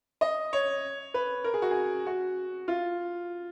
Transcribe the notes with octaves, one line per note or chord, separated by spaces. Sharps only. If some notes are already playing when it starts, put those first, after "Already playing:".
D#5
C#5
B4
A#4
G#4
F#4
G#4
F#4
F4